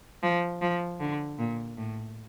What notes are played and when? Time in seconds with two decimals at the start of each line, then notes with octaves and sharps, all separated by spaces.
0.23 F3
0.62 F3
1.00 D3
1.39 A#2
1.77 A2